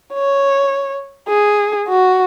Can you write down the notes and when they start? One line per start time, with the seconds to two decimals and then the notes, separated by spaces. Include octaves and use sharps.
0.14 C#5
1.28 G#4
1.88 F#4